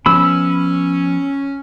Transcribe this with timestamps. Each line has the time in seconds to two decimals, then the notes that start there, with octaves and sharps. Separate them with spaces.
0.06 F3 B3 C#4 B5 E6